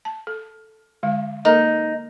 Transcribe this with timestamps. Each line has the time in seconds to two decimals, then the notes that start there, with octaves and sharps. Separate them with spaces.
0.05 A5
0.27 A4
1.03 D3 G#3 F5
1.45 A#3 D#4 A4 A#4